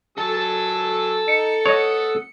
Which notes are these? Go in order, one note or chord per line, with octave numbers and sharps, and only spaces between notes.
F#3 A4 G#5 A5 E6
D#4 C#7
C#5 D#5 F#5 D#6